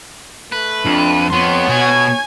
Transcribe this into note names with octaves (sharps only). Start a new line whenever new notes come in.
A3 B4
F2 D4
F2 B3 C#5 C6
B2 G#5 G#6